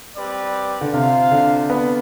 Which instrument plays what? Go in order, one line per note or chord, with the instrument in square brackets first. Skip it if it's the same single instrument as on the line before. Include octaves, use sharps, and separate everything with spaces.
[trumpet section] G3 C4 G4 B4 D5
[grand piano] D3
[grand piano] C3 [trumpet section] F4 C5 F5
[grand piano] D3
[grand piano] B3 [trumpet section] F4 B4 D5